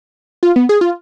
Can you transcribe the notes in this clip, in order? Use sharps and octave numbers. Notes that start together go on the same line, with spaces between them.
F4
B3
G#4
F4